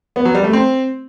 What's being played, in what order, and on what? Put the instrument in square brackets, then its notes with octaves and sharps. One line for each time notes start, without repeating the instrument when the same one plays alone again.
[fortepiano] B3
F#3
G3
A3
C4